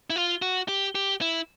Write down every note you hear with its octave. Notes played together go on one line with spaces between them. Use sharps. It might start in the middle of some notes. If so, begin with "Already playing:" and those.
E4
F4
F#4
G4
G4
E4